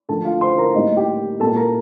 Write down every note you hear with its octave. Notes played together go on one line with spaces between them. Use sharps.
D3 F3 A3 A4 A5
F4 F5
C5 C6
A#4 A#5
A2 G3 A#3 D#4 D#5
G4 G5
A#2 G3 A#3 A4 A5
A#4 A#5